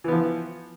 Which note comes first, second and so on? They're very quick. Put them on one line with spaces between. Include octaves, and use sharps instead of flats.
E3 B3 F3